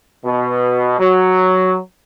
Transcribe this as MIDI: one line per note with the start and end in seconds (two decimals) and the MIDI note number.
0.25 0.97 47
0.99 1.77 54